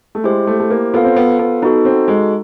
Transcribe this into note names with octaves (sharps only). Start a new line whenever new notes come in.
A3
G#3 E4 G4 C5
A3
A3
A#3
B3 F4 A4 C5 F5
C4
B3
B3
B3 D#4 F#4 A4
C4
G#3